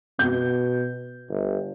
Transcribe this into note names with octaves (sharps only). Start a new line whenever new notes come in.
B2 G6
G1